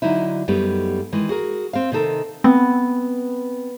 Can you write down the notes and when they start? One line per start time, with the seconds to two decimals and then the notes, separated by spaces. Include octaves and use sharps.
0.02 D3 F#3 D#4 E4
0.48 F#2 G3 A3 B3 D#4 G4
1.12 D#3 E3 G#3
1.29 F#4 G#4 A#4
1.73 C4 F5
1.92 C3 D#3 D#4 A4 A#4
2.44 B3 C4